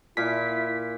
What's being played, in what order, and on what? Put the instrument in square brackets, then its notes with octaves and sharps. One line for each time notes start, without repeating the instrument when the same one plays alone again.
[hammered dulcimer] A#2 [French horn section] E4 [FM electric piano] B6